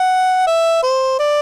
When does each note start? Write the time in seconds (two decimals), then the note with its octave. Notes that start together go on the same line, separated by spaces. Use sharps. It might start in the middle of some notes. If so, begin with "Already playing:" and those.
Already playing: F#5
0.47 E5
0.83 C5
1.19 D5